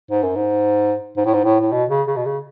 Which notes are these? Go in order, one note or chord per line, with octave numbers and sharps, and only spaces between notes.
G#2
F#2
G#2
G#2
A2
G#2
A2
A2
B2
C#3
C#3
B2
C#3